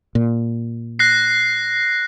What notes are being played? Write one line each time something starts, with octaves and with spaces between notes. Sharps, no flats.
A#2
F#6 A#6 C7